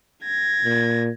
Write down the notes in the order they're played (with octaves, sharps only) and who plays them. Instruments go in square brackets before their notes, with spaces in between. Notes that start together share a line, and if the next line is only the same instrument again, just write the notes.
[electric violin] G#6 A#6
[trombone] A#2